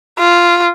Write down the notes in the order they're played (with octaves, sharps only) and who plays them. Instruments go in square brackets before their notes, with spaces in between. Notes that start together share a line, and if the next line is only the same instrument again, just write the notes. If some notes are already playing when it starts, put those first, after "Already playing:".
[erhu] F4